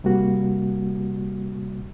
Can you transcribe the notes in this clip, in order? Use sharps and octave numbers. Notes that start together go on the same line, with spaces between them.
C3 G3 A#3 F#4